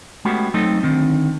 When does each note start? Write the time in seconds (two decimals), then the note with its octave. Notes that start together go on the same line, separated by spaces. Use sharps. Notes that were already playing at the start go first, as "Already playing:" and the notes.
0.25 G#3 A3 B3 C#4 F#4 G4
0.54 F#3 A3 C4 D#4 A4
0.83 D3 D#3 C4